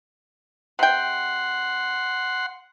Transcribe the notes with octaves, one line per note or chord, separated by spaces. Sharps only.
C3 F#5 G5 C6